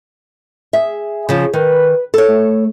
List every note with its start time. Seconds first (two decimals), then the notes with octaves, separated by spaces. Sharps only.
0.73 G#4 E5
1.29 C#3 F3
1.53 D#3 B4
2.14 A4 C#5
2.28 A3